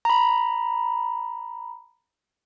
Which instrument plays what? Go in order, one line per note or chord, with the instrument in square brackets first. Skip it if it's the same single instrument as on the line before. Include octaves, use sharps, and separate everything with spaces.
[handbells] A#5 B5